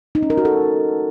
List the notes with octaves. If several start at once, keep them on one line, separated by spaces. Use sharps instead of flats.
D#4
C#4
A#4
F#4
A4